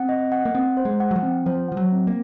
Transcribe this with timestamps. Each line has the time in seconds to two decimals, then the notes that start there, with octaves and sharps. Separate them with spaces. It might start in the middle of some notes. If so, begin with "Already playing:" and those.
Already playing: C4 F#5
0.09 D#5
0.32 F#5
0.45 A#3
0.55 C4 F#5
0.77 C5
0.85 G#3
1.00 F#5
1.11 F#3
1.16 F3
1.23 C4
1.46 F3 C5
1.68 F3 F#5
1.77 F#3
1.92 C4
2.07 A#3